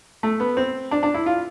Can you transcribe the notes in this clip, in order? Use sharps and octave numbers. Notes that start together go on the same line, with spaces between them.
A3
B3
C4
D4
D4
E4
F4